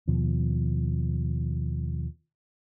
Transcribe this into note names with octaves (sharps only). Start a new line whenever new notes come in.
D#2 B2 F3